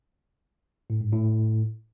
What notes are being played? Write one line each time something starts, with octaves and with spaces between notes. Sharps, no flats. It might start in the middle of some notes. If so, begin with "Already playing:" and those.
A2
G#2
A2